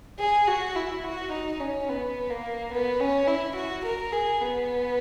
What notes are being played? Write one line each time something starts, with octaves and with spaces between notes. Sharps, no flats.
G#4
F#4
E4
F#4
D#4
C#4
B3
A#3
B3
C#4
E4
F#4
A#4
G#4
B3